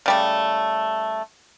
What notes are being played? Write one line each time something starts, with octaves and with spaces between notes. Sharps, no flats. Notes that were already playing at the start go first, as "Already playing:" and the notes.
C#3 G3 A3